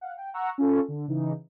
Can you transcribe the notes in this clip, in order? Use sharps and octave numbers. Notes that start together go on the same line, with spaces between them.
F5 F#5
G5
F#5 A#5 C#6 E6
C#4 F4 A4
D3
C#3 E3 D#4